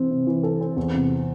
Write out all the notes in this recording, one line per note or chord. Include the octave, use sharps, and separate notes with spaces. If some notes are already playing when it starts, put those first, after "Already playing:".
Already playing: C3 E3 C4
C3
E3
A4
C4
E2
C3